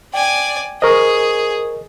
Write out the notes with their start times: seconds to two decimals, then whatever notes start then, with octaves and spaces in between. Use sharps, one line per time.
0.14 D5 G5 G#5
0.82 G#4 A#4 C5 D#5 C#6